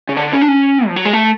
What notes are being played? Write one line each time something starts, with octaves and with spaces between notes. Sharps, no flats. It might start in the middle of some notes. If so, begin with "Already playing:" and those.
C#3
D3
C#4
D4
C#4
F3
F#3
G#3
A3